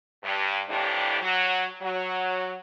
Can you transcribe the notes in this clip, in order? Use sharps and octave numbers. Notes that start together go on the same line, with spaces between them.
G2
F2 A2 C3 E3 D4 G4
F#3
F#3